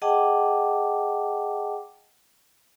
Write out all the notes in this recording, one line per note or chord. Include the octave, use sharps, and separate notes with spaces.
G#4 D#5 F#5 G5 A5 D6